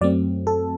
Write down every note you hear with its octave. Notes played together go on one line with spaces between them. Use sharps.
F#2 F#3 A3 C4 D5
A4